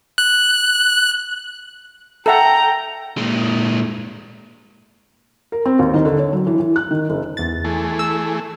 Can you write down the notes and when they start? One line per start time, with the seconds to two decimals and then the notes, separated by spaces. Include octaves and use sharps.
0.18 F#6
2.26 A4 E5 F#5 G5 A#5
3.18 A#2 G#3
5.52 A#4
5.66 C4
5.79 D#2
5.94 D#3
6.05 D3
6.19 C#5
6.33 F#3
6.47 E3
6.60 E3
6.76 F#6
6.91 D#3
7.10 F#1
7.37 E2 A6
7.64 E3 A3 G#4
7.99 E6